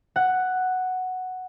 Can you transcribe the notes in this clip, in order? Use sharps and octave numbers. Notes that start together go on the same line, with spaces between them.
F#5